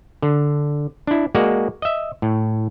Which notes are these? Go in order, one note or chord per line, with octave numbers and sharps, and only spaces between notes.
D3
D4 E4
G#3 A#3 F#4 D5
D#5 E5
A2